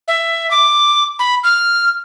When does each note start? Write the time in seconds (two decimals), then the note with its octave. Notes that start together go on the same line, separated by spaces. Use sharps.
0.08 E5
0.51 D6
1.19 B5
1.44 F6